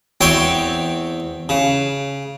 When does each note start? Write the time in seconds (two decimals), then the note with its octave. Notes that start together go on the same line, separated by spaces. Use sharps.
0.21 E2 C4 C#5 G5 C6
1.49 C#3